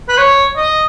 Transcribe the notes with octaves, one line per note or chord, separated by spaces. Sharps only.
B4
C#5
D#5